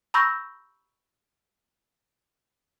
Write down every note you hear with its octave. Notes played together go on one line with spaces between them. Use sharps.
A#5 B5 C#6 E6 G6 A#6